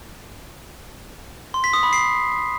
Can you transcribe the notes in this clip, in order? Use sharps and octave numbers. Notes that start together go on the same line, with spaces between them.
C6
B6
D#6
B5
C7